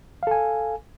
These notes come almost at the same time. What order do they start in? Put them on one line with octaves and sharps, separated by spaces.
F5 A4 G#5